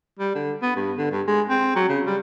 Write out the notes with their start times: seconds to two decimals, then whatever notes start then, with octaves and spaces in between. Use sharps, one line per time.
0.19 G3
0.35 D3
0.62 B3
0.76 G2
0.98 D3
1.11 G2
1.27 G#3
1.50 C4
1.76 F#3
1.89 C#3
2.07 G3